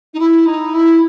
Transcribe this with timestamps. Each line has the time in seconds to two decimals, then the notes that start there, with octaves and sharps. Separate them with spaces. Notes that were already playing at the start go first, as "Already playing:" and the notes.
0.13 D#4
0.19 E4
0.46 D#4
0.73 E4